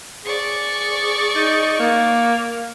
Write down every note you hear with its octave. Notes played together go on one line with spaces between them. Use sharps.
G#4 D5 C#6
D#4
A#3